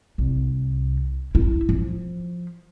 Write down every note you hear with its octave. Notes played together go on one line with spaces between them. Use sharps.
C2
E4
F3